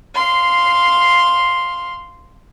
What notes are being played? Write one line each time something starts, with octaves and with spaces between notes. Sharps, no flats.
F5 C6